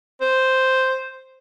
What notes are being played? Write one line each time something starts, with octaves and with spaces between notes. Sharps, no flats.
C5